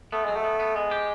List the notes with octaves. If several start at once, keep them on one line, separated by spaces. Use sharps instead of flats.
A3 B3
F#3 G#3
A3
B3
B3
G#3 B3
G4